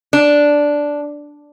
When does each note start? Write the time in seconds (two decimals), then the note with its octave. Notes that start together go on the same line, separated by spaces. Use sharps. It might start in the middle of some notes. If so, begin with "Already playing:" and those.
0.13 D4